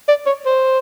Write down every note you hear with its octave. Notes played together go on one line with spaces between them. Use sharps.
D5
C#5
C5